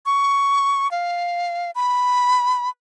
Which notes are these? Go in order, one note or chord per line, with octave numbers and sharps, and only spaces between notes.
C#6
F5
B5